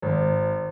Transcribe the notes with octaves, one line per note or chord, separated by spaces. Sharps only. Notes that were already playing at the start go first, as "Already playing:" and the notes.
G#1